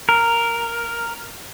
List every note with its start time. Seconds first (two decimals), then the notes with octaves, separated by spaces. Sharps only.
0.09 A#4